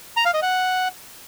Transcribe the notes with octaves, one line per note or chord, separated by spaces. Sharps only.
A#5
F5
D#5
F#5